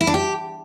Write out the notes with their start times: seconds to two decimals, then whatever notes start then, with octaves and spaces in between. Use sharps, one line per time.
0.01 E4
0.07 D4
0.14 G4